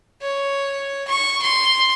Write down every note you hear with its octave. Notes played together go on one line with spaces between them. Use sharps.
C#5
C#6
C6